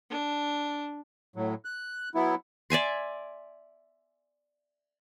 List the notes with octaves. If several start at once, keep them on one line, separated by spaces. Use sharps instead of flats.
D4
A2 F#3
F#6
F#3 B3 E4
D5 E5 G#5 C6